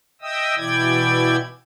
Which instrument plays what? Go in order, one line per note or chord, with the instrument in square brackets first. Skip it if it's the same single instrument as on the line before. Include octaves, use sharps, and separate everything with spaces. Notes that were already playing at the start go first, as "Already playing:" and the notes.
[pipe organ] D#5 E5 G5 D#6 E6
B2 E3 E4 D5 G5 G#6